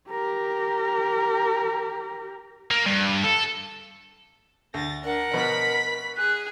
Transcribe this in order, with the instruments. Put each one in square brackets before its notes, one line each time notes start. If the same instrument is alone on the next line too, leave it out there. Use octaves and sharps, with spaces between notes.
[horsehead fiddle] G4 A#4
[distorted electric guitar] A#3
G2
A4
[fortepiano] D2 [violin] A6 A#6
[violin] D4 [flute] A#4 [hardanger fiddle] F#5
[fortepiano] B2 F3 B3 [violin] B5 B6
[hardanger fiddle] G#4 [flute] F#6